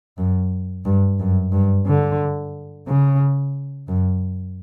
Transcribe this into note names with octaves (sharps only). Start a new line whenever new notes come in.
F#2
G2
F#2
G2
D3
C#3
F#2